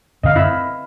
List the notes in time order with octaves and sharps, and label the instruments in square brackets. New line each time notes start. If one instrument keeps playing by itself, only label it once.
[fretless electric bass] F#2 D3 C4 [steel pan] D#5 F5
[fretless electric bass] C4 [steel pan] E4 B5 E6